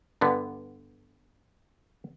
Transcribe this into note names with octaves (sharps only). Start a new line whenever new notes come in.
G2 D3 B3